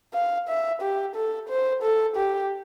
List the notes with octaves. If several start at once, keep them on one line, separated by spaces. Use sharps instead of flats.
F5
E5
G4
A4
C5
A4
G4